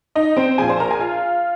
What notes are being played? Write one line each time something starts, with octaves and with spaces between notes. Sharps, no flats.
D#4 D#5
C4 C5
A#1 A#2 F3 G#4 G#5
C5 C6
A#4 A#5
G#4 G#5
F4 F5